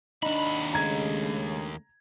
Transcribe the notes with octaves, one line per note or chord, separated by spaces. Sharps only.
D#2 D4 D#4 B5
C#3 G#3 A3 A#5 G#6